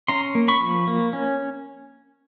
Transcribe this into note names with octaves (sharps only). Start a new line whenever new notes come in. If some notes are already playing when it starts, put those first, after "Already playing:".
C#4 A#5 C6
A#3
B5 C#6
F3
A#3
C#4